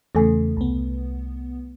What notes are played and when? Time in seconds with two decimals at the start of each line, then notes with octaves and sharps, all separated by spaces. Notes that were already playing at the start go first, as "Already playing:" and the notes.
0.15 E2 C#3 A3 A4 G#5
0.57 C2 B3